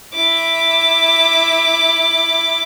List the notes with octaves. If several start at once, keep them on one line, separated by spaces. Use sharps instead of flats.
E4 D6